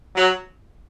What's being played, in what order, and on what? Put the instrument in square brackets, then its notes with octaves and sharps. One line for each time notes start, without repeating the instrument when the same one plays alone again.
[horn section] F#3